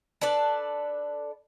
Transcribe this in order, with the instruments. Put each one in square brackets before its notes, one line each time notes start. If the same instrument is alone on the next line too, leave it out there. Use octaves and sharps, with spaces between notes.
[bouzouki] D4 A4 B4 D5